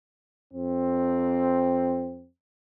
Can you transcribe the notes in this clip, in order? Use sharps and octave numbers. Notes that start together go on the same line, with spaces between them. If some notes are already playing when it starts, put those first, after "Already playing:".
F2 C4